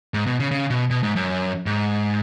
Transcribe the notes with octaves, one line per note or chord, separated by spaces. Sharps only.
G#2
B2
C#3
C#3
B2
B2
G#2
F#2
G#2